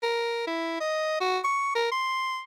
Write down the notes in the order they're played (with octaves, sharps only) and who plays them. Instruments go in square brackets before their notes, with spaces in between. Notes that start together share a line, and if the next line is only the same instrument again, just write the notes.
[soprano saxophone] A#4
E4
D#5
F#4
C#6
A#4
C6